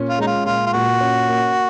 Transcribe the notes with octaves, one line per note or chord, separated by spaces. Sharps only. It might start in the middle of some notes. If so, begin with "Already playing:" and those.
Already playing: A#2 C#4
F4
G#3 D#4
F4
A#2 F4
F4
A#2 F#4
C#4
A#3